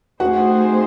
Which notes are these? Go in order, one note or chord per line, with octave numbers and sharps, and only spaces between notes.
A3 C4 D#4 F#4 G#4 C5 F#5